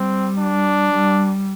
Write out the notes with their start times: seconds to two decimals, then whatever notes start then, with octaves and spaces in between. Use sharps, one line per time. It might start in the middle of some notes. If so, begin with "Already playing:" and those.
Already playing: G3 C4
0.38 D4
0.92 G3